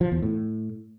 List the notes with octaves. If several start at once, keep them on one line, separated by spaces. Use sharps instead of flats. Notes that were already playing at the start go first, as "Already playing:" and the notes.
F3
E2
A2